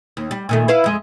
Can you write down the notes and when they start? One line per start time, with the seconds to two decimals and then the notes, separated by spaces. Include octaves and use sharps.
0.17 D#2
0.31 G3
0.49 A#2 D#3 A3
0.68 E4 B4 F5
0.84 F2 G#3